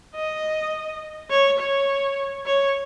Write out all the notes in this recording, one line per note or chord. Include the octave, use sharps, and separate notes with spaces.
D#5
C#5
C#5
C#5